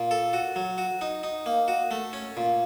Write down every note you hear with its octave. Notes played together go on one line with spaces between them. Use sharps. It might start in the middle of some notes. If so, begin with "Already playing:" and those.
Already playing: A#2
A4
F#4
F#3
F#4
D#4
D#4
A#3
F#4
A3
C#4
A#2